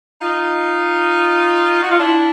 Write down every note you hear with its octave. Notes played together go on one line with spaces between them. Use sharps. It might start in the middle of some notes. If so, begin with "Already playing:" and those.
D#4 F4
F#4
F4
D4 E4